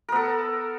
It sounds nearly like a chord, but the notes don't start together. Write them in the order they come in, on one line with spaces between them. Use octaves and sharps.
A#4 B3 A4